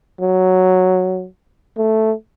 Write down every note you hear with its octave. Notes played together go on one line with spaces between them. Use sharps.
F#3
A3